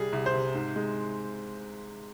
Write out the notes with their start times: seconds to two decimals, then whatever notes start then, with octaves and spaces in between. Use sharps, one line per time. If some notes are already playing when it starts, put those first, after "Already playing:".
Already playing: C2 G3 G#4
0.13 C2
0.26 C5
0.34 C3
0.54 G#2
0.76 G#3